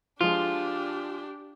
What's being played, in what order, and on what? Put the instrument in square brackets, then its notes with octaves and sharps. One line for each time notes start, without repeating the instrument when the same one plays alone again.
[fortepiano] F3 G#3 [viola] D4 G4 [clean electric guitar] F4